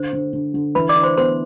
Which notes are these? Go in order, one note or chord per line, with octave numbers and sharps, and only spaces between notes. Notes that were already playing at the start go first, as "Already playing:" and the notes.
Already playing: D3 C5
D3
D3
D3
E3 B4 B5
D5 D6
D4
C5 C6
B3 C5 C6